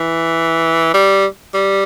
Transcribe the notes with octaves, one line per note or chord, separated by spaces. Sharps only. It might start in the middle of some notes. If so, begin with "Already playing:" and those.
Already playing: E3
G3
G3